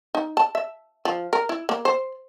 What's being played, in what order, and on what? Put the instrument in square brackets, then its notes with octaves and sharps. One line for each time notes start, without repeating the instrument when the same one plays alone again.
[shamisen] D#4
A5
E5
F3
A#4
E4
A#3
C5